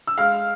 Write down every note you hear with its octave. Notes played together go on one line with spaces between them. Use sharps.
E6
G#3 F5 F6